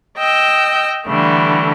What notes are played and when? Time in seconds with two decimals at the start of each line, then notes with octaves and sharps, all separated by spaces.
0.17 D#5 G5 E6
1.07 D3 E3 G3 A3